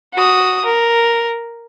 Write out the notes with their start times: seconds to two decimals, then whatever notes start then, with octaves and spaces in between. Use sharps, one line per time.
0.14 F#4 D#6
0.65 A#4